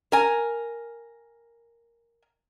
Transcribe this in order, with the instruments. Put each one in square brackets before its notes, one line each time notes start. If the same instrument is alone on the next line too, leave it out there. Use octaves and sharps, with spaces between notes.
[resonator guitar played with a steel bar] A#4 G#5